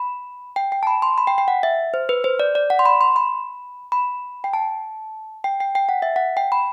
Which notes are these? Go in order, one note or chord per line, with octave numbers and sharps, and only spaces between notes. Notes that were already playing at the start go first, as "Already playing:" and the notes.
Already playing: B5
G5
G5
A5
B5
C6
B5
G5
G5
F#5
E5
C5
B4
C5
D5
D5
F#5
C6
B5
C6
B5
B5
G5
A5
G5
G5
G5
F#5
E5
F#5
G5
B5